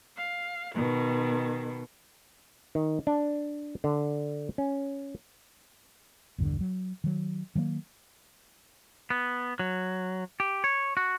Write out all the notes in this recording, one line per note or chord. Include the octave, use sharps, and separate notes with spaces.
F5
B2 D#3
D#3
D4
D3
C#4
A#1 E2 G2 D3
F#3
D#3 F#3
D#3 F#3 G#3 A#3
B3
F#3
G4
C#5
F#4